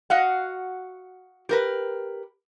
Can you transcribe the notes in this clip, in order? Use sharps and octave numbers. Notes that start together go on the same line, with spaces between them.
F#4 D#5 F5 F#5
G4 A#4 B4